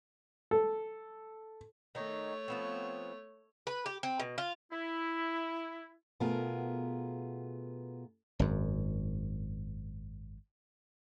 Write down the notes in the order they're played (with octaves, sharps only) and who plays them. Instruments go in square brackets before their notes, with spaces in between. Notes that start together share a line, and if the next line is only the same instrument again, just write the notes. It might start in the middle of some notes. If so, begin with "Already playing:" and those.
[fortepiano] A4
[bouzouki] D#3 D#4 [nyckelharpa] A3 C#5
[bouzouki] F3 B3 C4
B4
G4
C4
B2
F4
[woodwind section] E4
[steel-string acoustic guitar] B2 A3 B3 F4 G#4 A#4
[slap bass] G#1 F#2